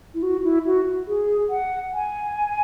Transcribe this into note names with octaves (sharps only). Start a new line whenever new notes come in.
E4
F#4
E4
F#4
G#4
F#5
G#5